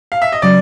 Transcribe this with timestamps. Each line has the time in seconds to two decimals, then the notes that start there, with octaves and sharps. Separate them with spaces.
0.12 F5
0.22 E5
0.32 D#5
0.42 C#3 F#3 D5